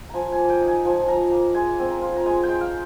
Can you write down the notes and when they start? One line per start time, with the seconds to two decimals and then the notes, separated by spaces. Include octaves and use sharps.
0.09 F3 G#5 A#5
0.32 A#3 G#5
0.50 G5
0.61 D#4
0.68 G#5
0.85 F3 G#5
1.00 G#5
1.08 F3 A#5
1.31 A#3 A#5
1.55 G#3 G#5
1.79 C4
1.90 A#5
2.02 F4
2.17 A#5
2.26 G#3 G#5
2.43 G5
2.49 G#3
2.61 F5